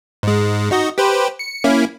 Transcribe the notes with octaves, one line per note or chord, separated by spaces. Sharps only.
G#2 G#3
D#4 F#4 D#5
G4 B4 C5
C#7
A#3 C#4 E4